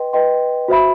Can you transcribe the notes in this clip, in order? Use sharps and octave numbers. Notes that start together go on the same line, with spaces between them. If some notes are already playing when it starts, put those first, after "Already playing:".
Already playing: B4 D#5 G5 C6
B4 D#5 G5 C6
F#4 C5 E5 B5